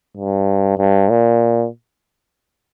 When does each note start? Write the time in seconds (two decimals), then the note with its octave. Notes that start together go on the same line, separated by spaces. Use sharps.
0.18 G2
0.78 G2
1.09 A#2